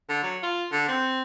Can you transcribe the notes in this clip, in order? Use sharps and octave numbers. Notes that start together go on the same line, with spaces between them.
D3
F#3
F4
D3
C4